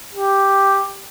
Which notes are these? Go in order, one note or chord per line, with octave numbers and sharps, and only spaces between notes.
G4